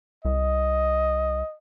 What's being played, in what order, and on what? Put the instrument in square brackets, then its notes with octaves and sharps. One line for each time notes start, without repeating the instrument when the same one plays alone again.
[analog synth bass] C2 [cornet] D#5